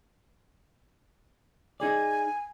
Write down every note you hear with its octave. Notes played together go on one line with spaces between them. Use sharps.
D#4 G#4 D5 G#5